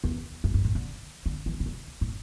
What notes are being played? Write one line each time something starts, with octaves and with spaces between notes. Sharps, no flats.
E2
G2
G2
A2
D3
D3
E3
C3
D3
A2